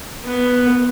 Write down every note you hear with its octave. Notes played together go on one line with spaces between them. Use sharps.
B3